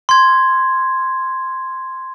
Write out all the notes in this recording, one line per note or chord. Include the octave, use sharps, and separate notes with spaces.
C6 G#6